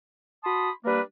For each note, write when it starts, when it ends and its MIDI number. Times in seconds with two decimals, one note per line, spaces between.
0.44 0.70 66
0.44 0.70 81
0.44 0.70 83
0.44 0.70 84
0.44 0.70 87
0.85 1.00 55
0.85 1.00 58
0.85 1.00 62
0.85 1.00 70
0.85 1.00 71